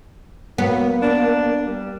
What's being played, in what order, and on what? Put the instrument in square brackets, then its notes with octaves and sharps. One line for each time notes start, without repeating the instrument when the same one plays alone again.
[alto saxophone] F#3 [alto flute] A#3 [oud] B3
[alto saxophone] D4
G3